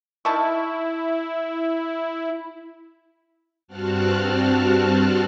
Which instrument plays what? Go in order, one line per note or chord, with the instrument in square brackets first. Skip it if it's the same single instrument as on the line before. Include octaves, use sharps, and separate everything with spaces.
[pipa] D#3 A5 C#6 [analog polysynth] E4
[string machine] G2 C4 F#4 A5 F6 F#6